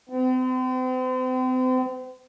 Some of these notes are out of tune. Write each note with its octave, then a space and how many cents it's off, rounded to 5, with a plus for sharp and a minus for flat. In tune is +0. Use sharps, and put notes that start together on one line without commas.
C4 -40